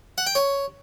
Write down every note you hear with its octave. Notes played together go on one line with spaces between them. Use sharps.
F#5
G5
C#5